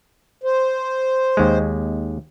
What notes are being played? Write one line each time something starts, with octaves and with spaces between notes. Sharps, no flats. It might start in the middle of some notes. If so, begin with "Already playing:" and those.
C5
D#2 G#3